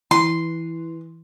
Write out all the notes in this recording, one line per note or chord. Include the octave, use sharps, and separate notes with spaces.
E3 C6